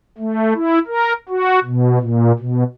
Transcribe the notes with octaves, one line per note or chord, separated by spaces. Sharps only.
A3
E4
A#4
F#4
B2
A#2
B2